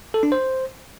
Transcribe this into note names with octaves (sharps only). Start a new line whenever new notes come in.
A4
D4
C5